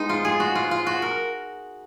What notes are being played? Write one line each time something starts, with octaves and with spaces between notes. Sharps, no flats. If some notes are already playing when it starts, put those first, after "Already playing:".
Already playing: G#3 B3 D#4
F4
G#4
F#4
F4
F4
F#4
A#4